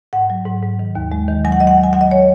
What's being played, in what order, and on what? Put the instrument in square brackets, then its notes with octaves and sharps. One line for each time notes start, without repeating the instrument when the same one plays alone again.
[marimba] G#2 F#5
F#3
G#2
G#2
D#3
D#2
G#3
D#3
F#3 G#5
F#5
F#3 D#5
F#5
F#3
G#5
F#3 F#5
D#5
C#5